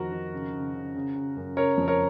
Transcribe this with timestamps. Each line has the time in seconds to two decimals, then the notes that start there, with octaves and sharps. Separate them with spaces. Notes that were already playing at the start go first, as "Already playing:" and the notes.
Already playing: F2 D#3 F#4 A#4
0.12 D#3
0.33 C#3
0.54 C#3
0.74 C#3
0.95 C#3
1.15 C#3
1.36 F#2
1.57 C#3 A#4 C#5
1.77 F2
1.88 A#4 C#5